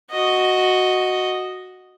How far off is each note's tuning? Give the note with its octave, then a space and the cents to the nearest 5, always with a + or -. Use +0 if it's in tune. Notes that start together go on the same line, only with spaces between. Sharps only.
F#4 -5 D#5 +0